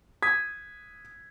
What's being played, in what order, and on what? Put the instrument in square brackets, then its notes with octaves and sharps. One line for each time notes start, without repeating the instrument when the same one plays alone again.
[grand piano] D#6 G#6 B6